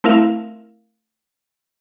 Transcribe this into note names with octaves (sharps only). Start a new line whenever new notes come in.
A3 C4 E4 A#4 E5 F5